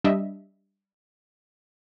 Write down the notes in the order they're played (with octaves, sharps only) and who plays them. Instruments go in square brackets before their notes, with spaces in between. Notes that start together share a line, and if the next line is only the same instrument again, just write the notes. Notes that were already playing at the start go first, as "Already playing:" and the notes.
[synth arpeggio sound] G3 D4 D#5 E5